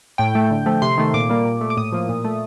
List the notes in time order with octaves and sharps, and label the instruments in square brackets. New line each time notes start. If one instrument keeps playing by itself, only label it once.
[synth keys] A2 G5
A3
D3
F3 A3
C3 C6
D#3 A3
A#2 D6
G3 A#3
A#2
A3
D6
A2 D#6
F3 A#3
A#2
A3